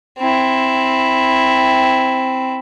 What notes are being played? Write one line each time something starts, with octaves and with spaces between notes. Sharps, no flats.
C4 E4